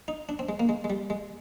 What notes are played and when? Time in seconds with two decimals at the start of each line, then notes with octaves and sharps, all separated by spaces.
0.08 D#4
0.29 D4
0.39 C4
0.49 G#3
0.60 A#3
0.69 G#3
0.84 G#3
0.90 G3
1.10 G#3